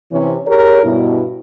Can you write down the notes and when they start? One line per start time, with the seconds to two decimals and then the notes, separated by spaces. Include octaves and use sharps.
0.12 C3 E3 C#4
0.47 G4 G#4 A#4 C#5
0.83 G2 B2 E4